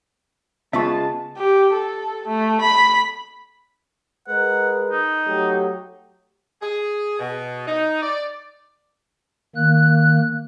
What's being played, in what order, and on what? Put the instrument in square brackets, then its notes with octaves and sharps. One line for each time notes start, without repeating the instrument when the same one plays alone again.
[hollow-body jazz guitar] C#3 B3 F4 [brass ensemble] G#3 A5 [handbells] E5 C#6
[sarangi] G4
A4
A3
B5
[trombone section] G#3 A#4 B4 [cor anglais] F#5
[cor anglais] D#4
[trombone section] F#3 A3 G4
[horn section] G#4
B2
D#4
D5
[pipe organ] D#3 A#3 F#6